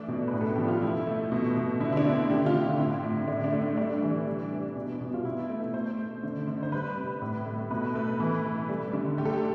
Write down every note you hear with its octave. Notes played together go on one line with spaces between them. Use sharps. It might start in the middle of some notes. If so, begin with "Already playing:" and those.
Already playing: E3 A3 D4
B2
B4
A2
A4
F3 G4
F4
F3 E4
A3
B2
B2
D3 E4
E4
D4
A3
C4
D3 G4
F4
D3
E4
A2 C4
A2
D3 D4
D4
A3
C4
G3 D4
E3
G3
C3
B2
B2
F4
B2 E4
A3
A3 C5
A3
D3
D3
C5
G3 B4
C3
A2
A3
B2 B4
A3 B4
E3
A3
G3
D3
A3 G4
A4
G4